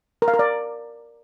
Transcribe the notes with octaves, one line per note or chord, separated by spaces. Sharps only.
A#4
F5
A#4
D5